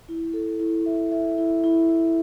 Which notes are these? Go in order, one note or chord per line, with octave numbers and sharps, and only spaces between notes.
E4
A4
E4
E5
E5
E4
E4
E4